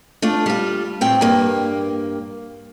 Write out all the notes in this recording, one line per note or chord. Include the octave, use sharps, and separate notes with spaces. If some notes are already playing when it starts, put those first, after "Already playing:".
A3 D4 F4
G3 F4
A2 C4 G5
G2 A#3